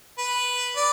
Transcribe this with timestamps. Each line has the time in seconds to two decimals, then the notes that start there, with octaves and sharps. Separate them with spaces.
0.18 B4
0.76 D5